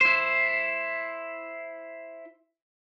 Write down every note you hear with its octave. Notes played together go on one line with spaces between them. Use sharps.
E4 C5